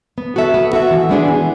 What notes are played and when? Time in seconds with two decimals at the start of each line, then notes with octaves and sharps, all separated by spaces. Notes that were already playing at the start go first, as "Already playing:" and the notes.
0.18 B3
0.36 F#4 A4 E5
0.54 B3
0.73 F#4 A4 E5
0.91 E3
1.09 G#3 B3 D4 G#4
1.28 E3